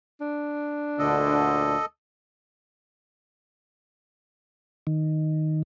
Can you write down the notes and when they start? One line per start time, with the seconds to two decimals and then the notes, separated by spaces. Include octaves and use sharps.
0.21 D4
0.99 D2 A#2 D3 A4 D#5
4.87 D#3